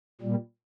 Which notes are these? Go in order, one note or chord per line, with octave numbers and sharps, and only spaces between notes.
A#2 G3